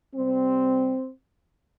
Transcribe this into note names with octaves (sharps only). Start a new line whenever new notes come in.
C3 G3 C4